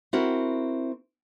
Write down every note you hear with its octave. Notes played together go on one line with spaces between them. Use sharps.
C4 E4 F#4 A#4